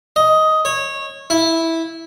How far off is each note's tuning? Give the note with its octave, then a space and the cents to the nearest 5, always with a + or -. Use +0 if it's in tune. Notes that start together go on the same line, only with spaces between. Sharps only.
D#5 +10
C#5 -20
E4 -10